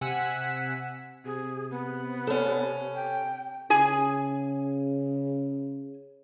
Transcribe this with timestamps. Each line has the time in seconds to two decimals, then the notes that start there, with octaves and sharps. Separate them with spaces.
0.01 C3 F#5 G#5 E6 B6
1.25 C3 G#4
1.71 B3
2.27 C#4 A4
2.95 G5
3.70 C#3 G#4 G#5